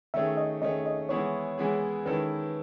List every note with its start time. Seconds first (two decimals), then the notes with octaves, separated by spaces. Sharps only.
0.14 D#3 A3 C#4 G#4 E5
0.37 D#5
0.62 D#3 A3 C#4 G#4 D#5
0.86 D#5
1.09 E3 G#3 B3 E4 G#4 C#5
1.58 E3 G#3 B3 E4 G#4
2.06 D#3 G#3 C#4 E4 A4 B4